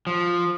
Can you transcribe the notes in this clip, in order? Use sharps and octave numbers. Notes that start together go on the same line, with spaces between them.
F3